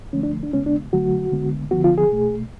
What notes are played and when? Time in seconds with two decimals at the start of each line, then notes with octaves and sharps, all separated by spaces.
0.13 D3 F3 A3 C#4
0.23 D4
0.43 D4
0.53 C#3 G#3 B3 C#4
0.66 D4
0.93 D3 F#3 A3 F#4
1.32 D3 G#3 B3
1.71 D3 F3 B3 F#4
1.84 F4
1.98 G#4
2.11 B2 A3